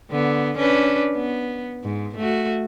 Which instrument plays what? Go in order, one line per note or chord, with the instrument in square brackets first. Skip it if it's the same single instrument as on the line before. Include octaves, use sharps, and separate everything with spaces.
[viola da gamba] D3 B3
C#4 D4 B4
B3
G#2
A3 F#4